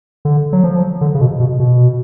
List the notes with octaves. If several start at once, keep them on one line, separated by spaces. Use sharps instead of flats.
D3
F#3
F3
D3
C#3
B2
B2
B2